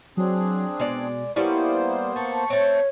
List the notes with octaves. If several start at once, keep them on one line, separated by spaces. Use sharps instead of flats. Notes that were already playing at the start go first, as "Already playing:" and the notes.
F#3 C4 D4 G#4
B2 G#3 D5
G3 A#3 B3 C#4 E4 C5 D5
A3 C#6
A3 C4 C#5